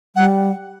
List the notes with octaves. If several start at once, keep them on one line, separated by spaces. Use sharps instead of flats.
G3 F#5